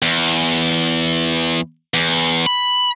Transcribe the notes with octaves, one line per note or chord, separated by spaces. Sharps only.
E2
E2
B5